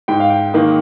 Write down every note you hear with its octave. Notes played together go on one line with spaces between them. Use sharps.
G#2 G5
F5
G5
D#3 A#3 D#4